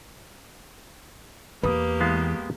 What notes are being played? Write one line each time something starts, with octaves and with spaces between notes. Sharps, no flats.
E2 A#3 G4 B4 D#6
E3 G#3 B3 F5